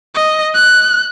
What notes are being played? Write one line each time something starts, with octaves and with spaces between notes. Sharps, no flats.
D#5
F#6